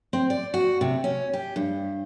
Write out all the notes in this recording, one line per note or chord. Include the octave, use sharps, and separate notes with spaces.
C4
D5
F#4
C3
C#4
G4
G2